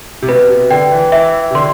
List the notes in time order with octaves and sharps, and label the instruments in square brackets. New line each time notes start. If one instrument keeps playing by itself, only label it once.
[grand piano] C3
[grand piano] B2 [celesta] B4
[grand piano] C3
[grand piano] D3 [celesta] G5
[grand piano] E3
[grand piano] E3 [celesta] E5
[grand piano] C3
[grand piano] D3 [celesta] C6